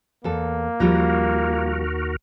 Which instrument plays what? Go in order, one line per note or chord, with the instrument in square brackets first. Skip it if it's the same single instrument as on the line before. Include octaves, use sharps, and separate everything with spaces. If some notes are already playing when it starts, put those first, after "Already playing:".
[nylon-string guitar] E2 A4 [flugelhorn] A#3
[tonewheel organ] D#2 F#4 A#4 [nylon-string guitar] F3 G3 F4